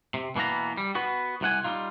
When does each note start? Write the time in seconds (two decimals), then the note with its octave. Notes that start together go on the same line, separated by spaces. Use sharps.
0.14 C3
0.36 B2 E3 A#3 B3 A#5
0.77 G3
0.95 B3 F#4 B4
1.41 C2 C3 F#5 G#5
1.64 G3 D#4 F4